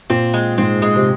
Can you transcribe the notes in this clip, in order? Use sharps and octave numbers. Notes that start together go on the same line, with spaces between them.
A#2 C4
G#3
G#2 C4
G#3
C3